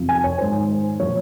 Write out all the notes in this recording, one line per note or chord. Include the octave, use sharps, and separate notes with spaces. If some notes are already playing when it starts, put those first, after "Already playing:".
Already playing: F2 C3 F3
G#5
C#5
G#2 D#3 C5
A#2 F3 C#5